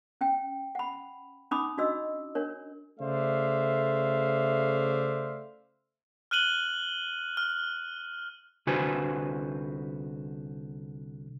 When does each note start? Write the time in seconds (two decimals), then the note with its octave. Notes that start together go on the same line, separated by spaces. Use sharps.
0.21 C#4 G5
0.75 F#5 B5
1.51 C#4 D#4 B5 D6 D#6
1.78 D4 F#4 D#5 E6
2.35 D4 A#4 C#5
3.00 C#3 A3 C5 D5 E5 F5
6.31 F6 F#6 D#7 F#7 G7
7.37 F6
8.67 C2 D3 F#4 B4 C5 G#5